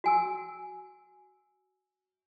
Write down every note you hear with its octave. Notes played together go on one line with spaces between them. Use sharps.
F#4 G#5 E6